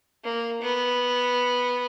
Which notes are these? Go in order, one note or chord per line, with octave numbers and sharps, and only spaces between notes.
A#3
B3